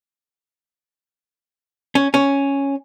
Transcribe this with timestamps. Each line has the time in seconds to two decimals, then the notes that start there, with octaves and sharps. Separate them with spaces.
1.95 C#4
2.14 C#4